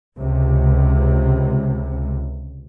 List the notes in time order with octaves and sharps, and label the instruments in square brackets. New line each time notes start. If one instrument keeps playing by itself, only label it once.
[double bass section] C#2 C3